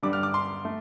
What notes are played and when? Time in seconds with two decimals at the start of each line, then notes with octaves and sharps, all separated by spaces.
0.03 G2 D3 G3 D6
0.13 F6
0.23 D6
0.34 C6
0.65 A3